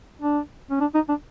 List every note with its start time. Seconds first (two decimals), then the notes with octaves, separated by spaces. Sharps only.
0.22 D4
0.71 C#4
0.81 D4
0.95 D#4
1.09 D4